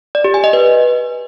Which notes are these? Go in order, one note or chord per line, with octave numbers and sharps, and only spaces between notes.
D5
G4
G#5
D#5
B4